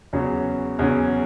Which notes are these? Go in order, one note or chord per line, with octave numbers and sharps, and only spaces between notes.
E2 C#3 F#3 C#4
E2 C#3 F#3 C#4